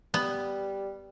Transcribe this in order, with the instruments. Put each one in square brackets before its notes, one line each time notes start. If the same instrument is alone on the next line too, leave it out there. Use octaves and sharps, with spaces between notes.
[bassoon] G3 [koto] B3